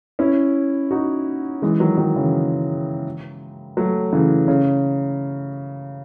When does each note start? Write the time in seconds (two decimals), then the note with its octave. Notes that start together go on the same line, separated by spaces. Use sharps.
0.19 C#4 E4
0.91 D#4 F#4
1.62 E3 G#3
1.80 D#3 F#3
1.98 D#3 F#3
2.16 C#3 E3
3.77 F#3 A3
4.13 C#3 E3
4.48 C#3